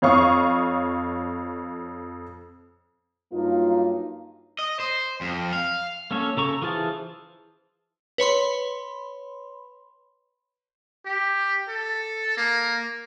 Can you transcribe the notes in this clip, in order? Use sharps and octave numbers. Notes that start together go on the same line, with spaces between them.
F2 C#5 F5 C#6 D#6
G2 F#3 A#3 D#4 F4
D#5
C5
F2
F5
A#3 C#4 A4 C#5
C#3 A4 A#5 C#6
E3 F4 G#4 C5 A5
B4 C#5 B5 C6
G4
A4
A#3